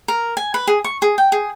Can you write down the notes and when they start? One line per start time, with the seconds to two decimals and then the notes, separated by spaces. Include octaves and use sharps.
0.08 A#4
0.37 G#5
0.54 B4
0.67 G#4
0.84 C#6
1.02 G#4
1.18 G5
1.32 G#4